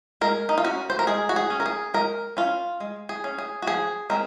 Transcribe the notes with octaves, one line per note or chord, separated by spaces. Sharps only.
G#3 A#4
D#4
F4
C#4 F#4
C5
A#4
G#3 G#4
F#4
G#4
C#4
A#4
G#4
G#3 A#4
C#4 F4
G#3
G#4
C#4
G#4
F#4
F3 G#4
G#3 C4 A#4